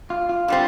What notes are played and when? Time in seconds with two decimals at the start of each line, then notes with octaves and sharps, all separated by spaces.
0.10 F4
0.29 F4
0.48 D3 G3 C4